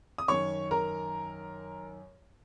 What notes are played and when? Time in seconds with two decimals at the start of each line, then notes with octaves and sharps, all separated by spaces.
0.18 D#6
0.28 F#2 D#3 C#5 C#6
0.71 A#4 A#5